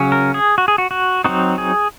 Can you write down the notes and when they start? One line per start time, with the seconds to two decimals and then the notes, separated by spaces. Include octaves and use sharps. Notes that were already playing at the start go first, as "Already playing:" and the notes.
Already playing: C#3 F#3 C#4
0.12 A#4
0.34 G#4
0.58 F#4
0.68 G#4
0.78 F#4
0.91 F#4
1.24 F#3 C4 D#4 F#4
1.58 G#4